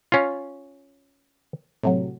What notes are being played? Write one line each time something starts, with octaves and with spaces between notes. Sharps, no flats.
C#4 F4
A2 C3 F#3